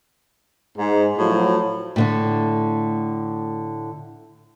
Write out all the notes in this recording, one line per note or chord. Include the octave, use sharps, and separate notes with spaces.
G#2
A2 F3 F#3
A2 D3 A3